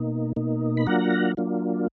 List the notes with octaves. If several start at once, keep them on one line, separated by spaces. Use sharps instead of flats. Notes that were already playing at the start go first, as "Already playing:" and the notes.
Already playing: B2 A#3 D#4
B2 A#3 D#4
B5
F#3 A#3 D4 F4 F#5 A#5
F#3 A#3 D4 F4